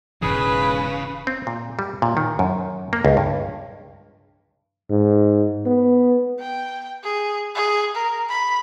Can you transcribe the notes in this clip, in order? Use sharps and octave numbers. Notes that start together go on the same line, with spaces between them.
E1 G#2 C#3 E3 G#4 B4
C4
A#2
G3
A#2
D#3
F#2
A#3
C#2
G2
G#2
B3
G5
G#4
G#4
A#4
B5